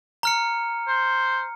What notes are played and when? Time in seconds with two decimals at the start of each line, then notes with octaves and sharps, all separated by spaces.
0.23 A#5 F6 C#7
0.88 C5